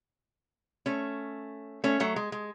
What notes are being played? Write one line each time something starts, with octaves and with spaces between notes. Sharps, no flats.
A3 C#4
A3 C#4
F#3 A3
G#3
G#3